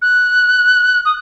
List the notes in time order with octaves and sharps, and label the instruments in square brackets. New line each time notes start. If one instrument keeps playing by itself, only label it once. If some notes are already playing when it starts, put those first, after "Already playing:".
[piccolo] F#6
D#6